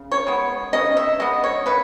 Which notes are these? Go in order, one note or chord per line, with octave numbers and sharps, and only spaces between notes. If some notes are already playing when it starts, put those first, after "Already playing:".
Already playing: C#3
C#5
G#3 B3
C#3 D#5
E5
G#3 B3 D#5
C#5
C#3 B4